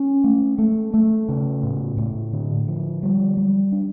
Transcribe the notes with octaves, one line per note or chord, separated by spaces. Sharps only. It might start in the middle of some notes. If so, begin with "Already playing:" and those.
Already playing: C#4
A3
A3
A3
C#3
A2
A2
D3
F3
G3
G3
D4